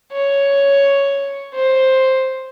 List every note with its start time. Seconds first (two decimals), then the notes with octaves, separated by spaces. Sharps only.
0.13 C#5
1.54 C5